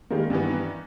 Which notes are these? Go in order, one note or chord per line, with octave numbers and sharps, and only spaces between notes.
D#3 G3 G#3 A#3
G2 D#3 E3 B3